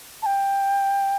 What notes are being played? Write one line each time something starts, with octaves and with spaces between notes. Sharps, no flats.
A5
G5